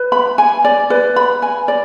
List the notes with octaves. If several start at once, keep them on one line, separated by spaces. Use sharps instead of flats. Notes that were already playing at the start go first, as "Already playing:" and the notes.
Already playing: B4
B5
G#5
D5
B4
B5
G#5
D5